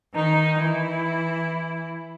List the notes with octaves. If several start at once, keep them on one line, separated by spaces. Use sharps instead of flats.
D#3 D#4
E3 E4